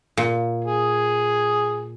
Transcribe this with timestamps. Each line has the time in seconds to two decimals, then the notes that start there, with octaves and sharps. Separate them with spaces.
0.17 A#2
0.65 G#4